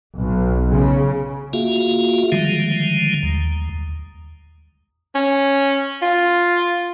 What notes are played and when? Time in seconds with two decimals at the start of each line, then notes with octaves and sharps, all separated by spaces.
0.19 B1
0.71 C#3
1.53 A#3 F4 F#4 G#4 E5 F5
2.32 D3 D#3 F3 G3 G#3
3.23 D#2
5.15 C#4
6.02 F4